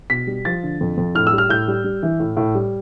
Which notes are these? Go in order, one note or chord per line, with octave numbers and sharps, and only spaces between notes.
B2 B6
G3
F3 A6
D3
F2
F2
A2 F6
E6
G3
F6
A2 G6
G3
G3
E3
A2
A2
G3